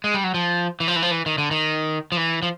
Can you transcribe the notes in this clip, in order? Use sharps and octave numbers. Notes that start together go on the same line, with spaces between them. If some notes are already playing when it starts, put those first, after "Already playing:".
G#3
G3
F#3
F3
E3
F3
E3
F3
E3
D#3
D3
D#3
F3
E3
F3